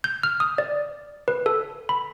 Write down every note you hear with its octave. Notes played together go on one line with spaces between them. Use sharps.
G6
F6
D#6
D5
B4
A4
B5